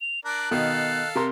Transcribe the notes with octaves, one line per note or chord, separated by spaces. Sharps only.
F7
D4 A#4 D5 F#6
B2 D#3 A4 F5
C3 A#4 A#5 C6